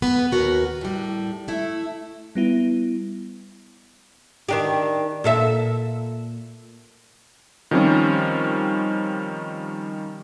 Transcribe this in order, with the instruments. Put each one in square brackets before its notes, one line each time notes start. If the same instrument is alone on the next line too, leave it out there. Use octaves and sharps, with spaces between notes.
[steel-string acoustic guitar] B3 B4
D#2 F#4 A#4 B4
A2 G3
A3 E4
[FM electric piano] G3 B3 E4
[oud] D#3 D4 G4
A#2 A4 E5
[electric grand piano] D#3 F3 G3 C4 C#4